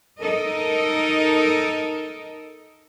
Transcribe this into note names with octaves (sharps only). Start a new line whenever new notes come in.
D#4 A4 A#4 D#5